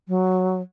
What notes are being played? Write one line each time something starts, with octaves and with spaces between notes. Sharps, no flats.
F#3